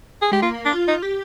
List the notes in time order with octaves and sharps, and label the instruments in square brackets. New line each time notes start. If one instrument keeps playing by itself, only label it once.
[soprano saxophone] G#4
[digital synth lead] G#3 [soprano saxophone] G4
[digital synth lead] A#3 [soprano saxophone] F4
[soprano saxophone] D4
[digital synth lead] F4
[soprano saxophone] D#4
[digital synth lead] G4